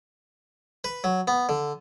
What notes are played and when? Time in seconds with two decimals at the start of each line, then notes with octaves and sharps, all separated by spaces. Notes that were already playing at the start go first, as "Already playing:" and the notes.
0.84 B4
1.04 F#3
1.28 B3
1.49 D3